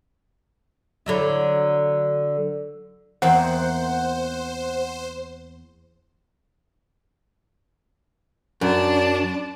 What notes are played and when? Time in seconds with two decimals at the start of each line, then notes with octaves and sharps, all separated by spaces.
1.06 D3 F#3 E4
3.22 E2 A#3 C4 C5 F#5
8.61 F#2 D4 A5